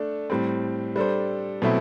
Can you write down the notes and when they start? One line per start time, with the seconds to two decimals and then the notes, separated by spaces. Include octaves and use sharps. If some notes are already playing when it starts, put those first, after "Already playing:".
Already playing: A3 D4 A4
0.30 A2 G3 C4
0.96 G3 D4 A4 C5
1.62 B2 F#3 A3 C4 E4